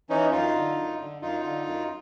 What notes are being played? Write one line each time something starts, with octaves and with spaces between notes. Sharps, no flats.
E3 C#4 D#4
F#2 D#4 F4
D3
F#2
D3
F#2 D#4 F4
D3
F#2